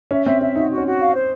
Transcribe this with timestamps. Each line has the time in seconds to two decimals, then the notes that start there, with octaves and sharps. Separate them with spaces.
0.11 C#4 E5
0.26 C4 E5
0.41 C#4 E5
0.55 D#4 F#4
0.70 F#4
0.78 C#4
0.85 F#4
1.00 F5
1.15 C5